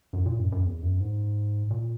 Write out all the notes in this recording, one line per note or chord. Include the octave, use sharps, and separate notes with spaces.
F#2
A#2
F#2
F#2
E2
F#2
G#2
A#2